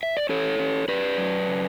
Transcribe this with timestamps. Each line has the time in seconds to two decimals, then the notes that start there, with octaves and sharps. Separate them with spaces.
0.03 E5
0.17 D5
0.29 C#4 A4 C#5
0.59 C#4
0.88 C#4 B4 D5
1.18 F#3
1.47 C#3